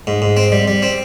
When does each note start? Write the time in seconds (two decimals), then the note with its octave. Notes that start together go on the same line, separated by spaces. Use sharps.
0.07 G#2
0.22 G#2
0.37 C4
0.52 G3
0.68 G3
0.82 C4